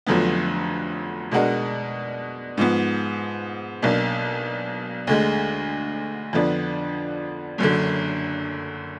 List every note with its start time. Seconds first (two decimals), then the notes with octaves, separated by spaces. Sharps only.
0.06 F1 F2 D3 F#3 B3
1.31 B2 G#3 D4 F#4 A#4
2.57 G#2 F3 B3
3.82 B1 B2 A#3 D4
5.07 D2 D3 G#3
6.33 F2 D3 F3 B3 D4
7.58 F#1 F#2 D3